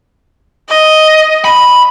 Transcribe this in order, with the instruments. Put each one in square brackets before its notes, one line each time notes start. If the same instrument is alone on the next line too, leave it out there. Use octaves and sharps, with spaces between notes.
[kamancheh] D#5
[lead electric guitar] B5